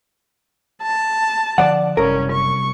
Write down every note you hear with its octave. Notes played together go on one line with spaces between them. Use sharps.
A5
D3 D#3 F3 D5 F#5
F#1 C2 C#4 A#4
C#6